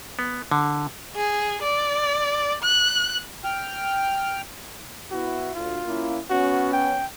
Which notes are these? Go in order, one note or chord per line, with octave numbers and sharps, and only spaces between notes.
B3
D3
G#4
D5
F#6
G5 F6
B3 E4 F#4
D2 F4
A#3 C#4 E4
B3 C#4 F#4
G5